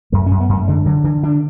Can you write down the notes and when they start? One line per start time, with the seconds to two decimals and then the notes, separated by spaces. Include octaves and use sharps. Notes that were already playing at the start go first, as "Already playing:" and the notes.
0.12 F#2 A3
0.26 C#4
0.31 F#2
0.40 B3
0.49 F#2 A3
0.68 D3 G#3
0.86 D3 F#3
1.04 D3 E3
1.23 D3 D4